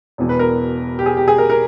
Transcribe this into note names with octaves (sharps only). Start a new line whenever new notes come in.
E1 E2 B2
B4
A#4
G4
G#4
G4
G#4
A#4
A#4